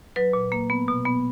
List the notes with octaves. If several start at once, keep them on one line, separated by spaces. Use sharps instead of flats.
F#3 B4
A#2
A#3
B3
B2
B3